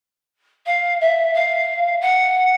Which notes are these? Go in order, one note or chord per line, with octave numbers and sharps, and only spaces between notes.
F5
E5
F5
F#5